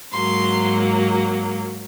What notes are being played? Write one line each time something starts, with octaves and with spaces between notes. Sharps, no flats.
G#2 F#3 A#3 C6